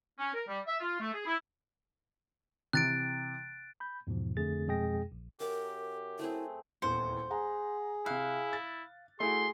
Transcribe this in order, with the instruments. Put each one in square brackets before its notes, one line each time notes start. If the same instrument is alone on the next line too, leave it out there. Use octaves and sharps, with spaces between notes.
[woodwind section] C#4
A#4
G3
E5
F4
A3
G#4
E4
[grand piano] C3 E3 [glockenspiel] F#6 A6 D7
[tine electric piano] B5 G6
E2 G#2 B2 F3
F2 D3 A3 G#4 A6
F2 B2 G#3 G#4 G5 A#6
A#1
[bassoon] F#2 [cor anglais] G4 [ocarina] A#4 [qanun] D6
[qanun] A3 C4 G#4 [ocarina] E4
[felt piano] D#1 E2 C#7 [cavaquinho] C5
[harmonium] G#4 [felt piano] F#5 A#5
[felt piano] C3 F#6 [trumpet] E4 [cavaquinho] F5
[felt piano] A6
[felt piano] A3 E4 F#4 [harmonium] G#4 [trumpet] C6